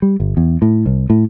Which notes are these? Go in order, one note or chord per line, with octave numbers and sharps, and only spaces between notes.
G3
G1
E2
A2
C2
A2